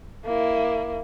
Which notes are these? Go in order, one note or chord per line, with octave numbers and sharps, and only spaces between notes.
A#3 E4